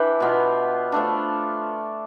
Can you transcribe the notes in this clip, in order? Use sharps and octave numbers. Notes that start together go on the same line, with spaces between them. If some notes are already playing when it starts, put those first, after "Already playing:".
Already playing: E3 D4 G5 B5
B2 B3 F4
F3 A3 D4